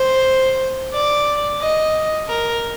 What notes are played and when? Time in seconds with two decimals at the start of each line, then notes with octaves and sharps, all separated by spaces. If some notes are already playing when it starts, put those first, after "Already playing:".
Already playing: C5
0.94 D5
1.61 D#5
2.29 A#4